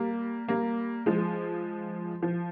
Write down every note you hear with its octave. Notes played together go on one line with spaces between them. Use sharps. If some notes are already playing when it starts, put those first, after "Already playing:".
Already playing: G3 A#3
G3 A#3
F3 G#3
F3